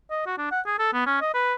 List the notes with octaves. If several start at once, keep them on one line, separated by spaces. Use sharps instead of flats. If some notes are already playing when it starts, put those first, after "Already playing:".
D#5
F#4
D4
F#5
G#4
A4
B3
C#4
D#5
B4